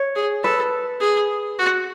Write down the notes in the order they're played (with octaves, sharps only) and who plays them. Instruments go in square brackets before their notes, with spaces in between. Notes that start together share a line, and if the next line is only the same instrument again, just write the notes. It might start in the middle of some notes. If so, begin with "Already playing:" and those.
Already playing: [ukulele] C#5
[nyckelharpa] G#4
[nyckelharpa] A4 [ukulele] B4
[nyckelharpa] G#4
F#4